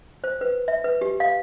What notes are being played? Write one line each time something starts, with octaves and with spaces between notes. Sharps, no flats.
C5
B4
E5
B4
G4
F5